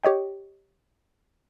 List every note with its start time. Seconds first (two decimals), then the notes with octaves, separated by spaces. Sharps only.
0.04 G4 C#5 D#5 G5